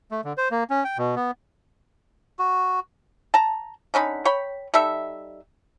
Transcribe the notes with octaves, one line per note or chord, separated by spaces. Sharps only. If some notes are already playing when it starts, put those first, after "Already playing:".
A3
D3
C5
A#3
C#4
G5
B2
B3
F#4
A5 A#5
D3 C#4 D#4 B5
C#5 G5 B5
G3 D#4 A4 E5